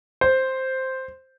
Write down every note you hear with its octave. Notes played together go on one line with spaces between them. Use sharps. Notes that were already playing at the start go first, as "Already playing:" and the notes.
C5